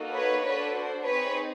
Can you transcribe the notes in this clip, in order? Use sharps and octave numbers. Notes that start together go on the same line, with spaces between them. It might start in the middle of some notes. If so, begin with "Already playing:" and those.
Already playing: A#3 D#4 F#4 A4
B4 C#5
D4 F#4 A4 B4 C#5
C5
C4 D#4 G#4 B4 C#5